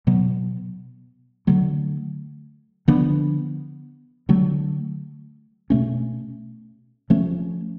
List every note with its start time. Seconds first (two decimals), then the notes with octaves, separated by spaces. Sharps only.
0.07 B2 F#3 B3
1.47 D3 F#3 A3
2.88 D3 F3 B3 D4
4.29 D3 F#3 A3
5.70 B2 A3 C#4
7.10 F3 A3 C#4